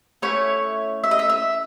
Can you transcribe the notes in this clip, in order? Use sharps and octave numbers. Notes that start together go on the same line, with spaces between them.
A3 C#4 E4 C#5
E5
D#5
E5
E5